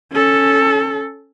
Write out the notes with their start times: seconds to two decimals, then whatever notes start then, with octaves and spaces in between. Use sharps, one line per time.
0.12 C#4 A4